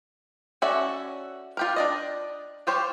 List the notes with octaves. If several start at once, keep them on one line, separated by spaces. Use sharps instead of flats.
C#4 F#4 A4 D5 E5
F4 G4 A#4
D4 D5 D#5
F4 G4 C5 C#5